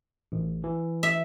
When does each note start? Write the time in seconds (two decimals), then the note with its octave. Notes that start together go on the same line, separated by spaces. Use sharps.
0.32 A1
0.64 E3
1.03 E5